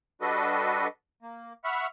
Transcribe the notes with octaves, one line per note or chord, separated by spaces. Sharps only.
G3 D4 F#4 A4 B4 D#5
A#3
E5 F#5 B5 C#6 F6